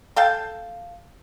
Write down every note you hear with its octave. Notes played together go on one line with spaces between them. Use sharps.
A4 F5 G5 A5